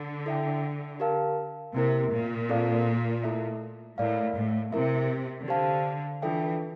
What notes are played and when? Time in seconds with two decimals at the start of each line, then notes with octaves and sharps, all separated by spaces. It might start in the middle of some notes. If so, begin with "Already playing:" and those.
Already playing: D3
0.26 E4 A4 E5 G5
1.00 G4 A#4 F5 A5
1.75 C3 A#3 E4 A#4
2.12 A#2
2.49 C4 F4 A4 D5 F5
3.24 A3 E4 A4 E5
3.98 A2 E4 A#4 D5 F5
4.35 A2
4.72 C3 E4 A#4 E5
5.47 D3 G4 C5 F5 A5
6.22 E3 D4 F4 A4 E5 G5